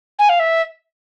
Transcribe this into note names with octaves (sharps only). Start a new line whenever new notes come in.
G#5
F5
E5